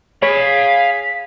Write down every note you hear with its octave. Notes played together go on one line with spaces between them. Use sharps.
G#4 C#5 F5 G#5 B5 B6